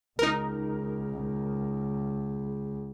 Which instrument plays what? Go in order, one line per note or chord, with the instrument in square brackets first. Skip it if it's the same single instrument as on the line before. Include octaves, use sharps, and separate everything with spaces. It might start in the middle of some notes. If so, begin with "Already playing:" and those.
[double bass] C#2 [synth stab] D#4 A#4